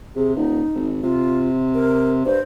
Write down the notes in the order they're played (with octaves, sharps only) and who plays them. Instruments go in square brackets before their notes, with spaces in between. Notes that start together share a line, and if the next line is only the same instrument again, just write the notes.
[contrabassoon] C3 [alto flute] G#4
[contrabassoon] D#1 [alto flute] D#4
[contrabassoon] G#1
[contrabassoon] C3 [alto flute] F4
[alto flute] A#4
[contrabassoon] G2 [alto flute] C5